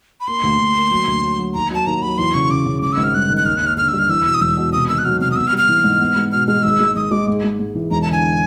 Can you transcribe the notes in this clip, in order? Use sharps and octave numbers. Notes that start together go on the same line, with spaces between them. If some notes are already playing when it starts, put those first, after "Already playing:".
B5
A#3 C6
D2
D2
A#3
F#3
D2
F#3
F#3
D#2 A#5
F#3 A5
D#2 A#5
F#3 B5
E2 C6
C#3 C#6
C#3 D6
C#3
G#1 D6
E6
G#1
F6
G2 F#6
D#3
F#6
D#2 F6
F#6
D#2
F6
D3 F6
G3 E6
F6
E2 E6
B2
D#6
E1 E6
B2
C3 D#6
D#3 E6
F#6
F#3 F6
C3 F6
D#6
B3 E6
F6
G3
F6
E3
G#2
B3
G#3
B2 F6
G#3 F6
G#1 E6
G#3
G#1 D#6
G#3 D6
G#2
G#3
G#2
E3
E1 A#5
A5
D3 G#5